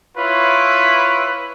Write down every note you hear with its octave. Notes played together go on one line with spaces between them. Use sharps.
E4 F4 B4 C#5